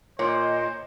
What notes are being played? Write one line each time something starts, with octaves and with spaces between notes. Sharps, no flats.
A#2 C5 C#5 D#5